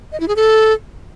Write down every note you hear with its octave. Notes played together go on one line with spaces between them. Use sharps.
D#5
E4
G#4
A4